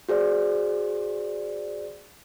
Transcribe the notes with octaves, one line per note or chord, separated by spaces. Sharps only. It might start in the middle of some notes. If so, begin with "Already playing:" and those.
F#4 G#4 C5 D5